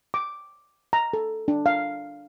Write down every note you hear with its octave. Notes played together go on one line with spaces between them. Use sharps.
D6
A#5
A4
D4
F5